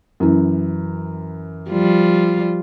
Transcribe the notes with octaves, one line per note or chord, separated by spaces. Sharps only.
F#2 E3
F3 G3 F4